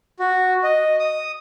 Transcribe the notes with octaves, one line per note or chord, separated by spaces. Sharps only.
F#4
D#5
D#6